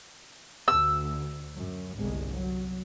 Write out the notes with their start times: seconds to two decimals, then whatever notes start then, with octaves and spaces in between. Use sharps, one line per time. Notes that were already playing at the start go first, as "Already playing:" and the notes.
0.68 D2 E6
1.57 F#2
1.99 G1 C2 G#3
2.34 F#3